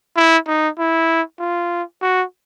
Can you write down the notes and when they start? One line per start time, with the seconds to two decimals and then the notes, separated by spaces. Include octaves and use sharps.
0.16 E4
0.47 D#4
0.78 E4
1.39 F4
2.02 F#4